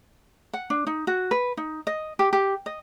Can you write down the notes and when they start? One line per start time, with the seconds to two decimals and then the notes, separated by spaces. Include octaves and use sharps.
0.53 F#5
0.70 D4
0.87 D#4
1.07 F#4
1.31 B4
1.57 D#4
1.87 D#5
2.19 G4
2.33 G4
2.66 D#5